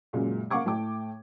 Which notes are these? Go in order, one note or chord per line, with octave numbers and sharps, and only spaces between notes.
F#2 A#2 C#3 F#3 G#3
A#3 F5 F#5 C#6 D6 G#6
A2 A3 G5 D6